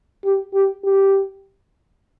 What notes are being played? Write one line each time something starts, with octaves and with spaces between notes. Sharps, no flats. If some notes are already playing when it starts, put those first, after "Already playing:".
G4
G4
G4